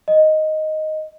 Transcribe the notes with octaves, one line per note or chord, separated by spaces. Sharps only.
D#5